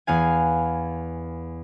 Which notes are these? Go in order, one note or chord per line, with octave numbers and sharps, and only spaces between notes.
E2 B3 F5 G#5